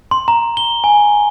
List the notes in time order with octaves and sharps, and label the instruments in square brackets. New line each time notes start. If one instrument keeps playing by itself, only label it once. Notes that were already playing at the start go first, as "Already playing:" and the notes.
[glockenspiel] C6
A#5
G7
G#5